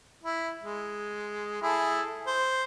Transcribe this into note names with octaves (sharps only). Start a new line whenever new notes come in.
E4
G#3
E4 G#4 A4
C5